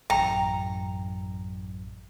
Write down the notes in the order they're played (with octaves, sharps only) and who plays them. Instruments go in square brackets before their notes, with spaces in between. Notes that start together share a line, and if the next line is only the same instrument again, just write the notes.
[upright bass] A1 F#2 [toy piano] G5 [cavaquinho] A#5